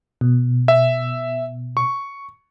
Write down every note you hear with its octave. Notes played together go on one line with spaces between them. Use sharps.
B2
E5
C#6